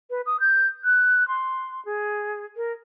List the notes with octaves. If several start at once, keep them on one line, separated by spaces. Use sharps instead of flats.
B4
D#6
G6
F#6
C6
G#4
A#4